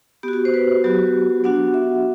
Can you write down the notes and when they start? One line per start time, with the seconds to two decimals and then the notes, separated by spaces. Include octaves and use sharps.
0.23 B3 F#4 G4
0.33 F#4
0.45 C5
0.54 B4
0.84 F#3 B3 F#4 G4
1.44 B3 D4 F#4 F#5
1.74 E5